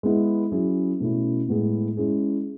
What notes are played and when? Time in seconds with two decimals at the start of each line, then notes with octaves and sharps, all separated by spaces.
0.03 G#3 B3 E4 G#4
0.52 F#3 C#4 E4 G#4
1.00 B2 A3 C#4 E4
1.48 A2 G#3 B3 E4 G#4
1.97 G#3 C#4 E4 G#4